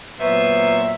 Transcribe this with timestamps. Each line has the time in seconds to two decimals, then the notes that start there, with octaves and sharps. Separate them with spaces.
0.20 A#2 F#3 B3 C5 E5